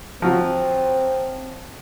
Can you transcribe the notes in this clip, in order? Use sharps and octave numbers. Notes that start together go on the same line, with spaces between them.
F3 F#3 C4